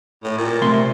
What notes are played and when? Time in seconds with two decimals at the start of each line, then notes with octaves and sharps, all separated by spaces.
0.24 A2
0.38 A#2
0.62 C3 A3 C6